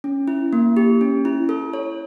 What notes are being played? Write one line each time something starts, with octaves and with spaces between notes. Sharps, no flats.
C#4
E4
A#3
G4
C#4
E4
A4
C#5